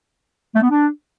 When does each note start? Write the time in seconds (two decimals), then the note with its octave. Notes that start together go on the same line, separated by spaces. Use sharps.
0.55 A3
0.62 B3
0.70 D4